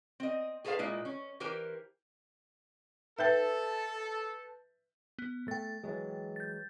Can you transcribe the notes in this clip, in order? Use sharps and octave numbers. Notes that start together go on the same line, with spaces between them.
C4 D#5
G#4 A4 B4 C5 F5
A#2 G#3 E4 D#5
C#4
E3 G4 A#4 C5 G#5
A4 B4 E5 G5 A5 G6 A6
B3
A3 G5 A6
E3 F#3 G#3
G6 A6